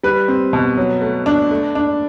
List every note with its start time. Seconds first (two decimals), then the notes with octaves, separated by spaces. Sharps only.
0.03 G3 B4
0.28 C4
0.53 B2
0.77 F#3
1.02 A3
1.26 D4
1.51 A3
1.75 D4